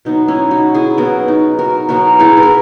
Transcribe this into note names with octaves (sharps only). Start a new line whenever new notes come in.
B2 F#3 B3 D#4
C#4 E4
D#4 F#4
E4 G#4
B2 F#3 B3 F#4 A#4
D#4
F#4 A#4
B2 F#3 B3 F#4 A#4
E4 G#4
B4
A#4